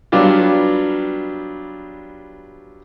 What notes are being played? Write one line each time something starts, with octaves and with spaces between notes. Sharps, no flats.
F#3 G3 B3 D4 F4 G4